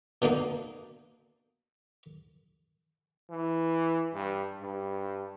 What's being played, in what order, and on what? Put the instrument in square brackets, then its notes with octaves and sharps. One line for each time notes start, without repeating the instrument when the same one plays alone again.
[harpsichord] B2 D3 A#3 D#4
[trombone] E3
G2
G2